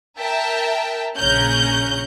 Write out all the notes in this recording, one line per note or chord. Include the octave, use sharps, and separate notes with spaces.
A#4 E5 G5 A5
A#1 C#3 C#4 A#5 F#6 G6